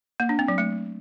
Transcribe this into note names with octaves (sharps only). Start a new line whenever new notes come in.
A#3
D4
C4
F#3
A3